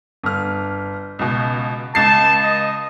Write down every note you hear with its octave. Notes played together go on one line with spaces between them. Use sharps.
G1 F6
C#2 B2
C#2 A5 C7
D#5